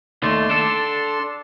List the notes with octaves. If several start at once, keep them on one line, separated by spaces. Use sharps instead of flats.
D#2 A3 D5 C6
D4 A4